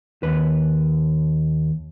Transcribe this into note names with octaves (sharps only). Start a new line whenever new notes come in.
D#2 B4